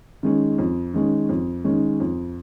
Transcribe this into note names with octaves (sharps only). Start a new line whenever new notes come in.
D#3 G#3 C#4
F2
D#3 G#3 C#4
F2
D#3 G#3 C#4
F2